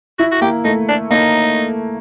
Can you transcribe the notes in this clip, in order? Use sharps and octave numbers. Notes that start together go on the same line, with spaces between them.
E4 F#4
F#4
A#3 G4
A3 D#4
D4
A#3 D#4